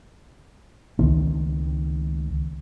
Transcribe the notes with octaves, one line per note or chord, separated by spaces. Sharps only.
C#2 D#3 C4